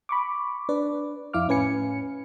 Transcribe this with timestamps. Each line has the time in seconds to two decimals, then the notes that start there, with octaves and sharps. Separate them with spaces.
0.09 B5 C#6 D6
0.69 D4 B4 D5
1.33 F2 E4 F5 D6 F6
1.48 A2 C#4 B4 G#5 C#7